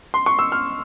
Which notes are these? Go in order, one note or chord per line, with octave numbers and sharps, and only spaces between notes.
C6
C#6
E6
F6